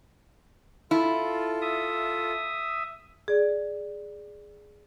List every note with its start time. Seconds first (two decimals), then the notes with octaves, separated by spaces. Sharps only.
0.91 E4 F4 A4
1.61 E5 D#6
3.28 G#4 D5